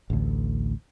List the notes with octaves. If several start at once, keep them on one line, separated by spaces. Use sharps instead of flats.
A1 D2